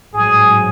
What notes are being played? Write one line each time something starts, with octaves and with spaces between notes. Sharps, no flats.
A1 G#2 F#3 G#4